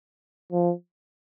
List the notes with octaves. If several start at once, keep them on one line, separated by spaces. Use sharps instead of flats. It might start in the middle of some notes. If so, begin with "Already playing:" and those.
F3